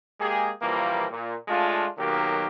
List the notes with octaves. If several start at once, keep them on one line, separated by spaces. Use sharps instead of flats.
G#3 A#3 G4 G#4
A#1 E3 F3 G3 A#3
A#2
G#3 A3 D4 F4
B1 D#3 F#3 A#3 G4 A#4